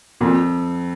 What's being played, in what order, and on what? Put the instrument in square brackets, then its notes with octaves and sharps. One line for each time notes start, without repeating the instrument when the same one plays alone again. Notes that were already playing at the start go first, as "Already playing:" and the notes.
[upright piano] F2 [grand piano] A#2 A#3